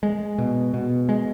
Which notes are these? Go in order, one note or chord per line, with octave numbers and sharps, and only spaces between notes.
G#3
B2
B2
G#3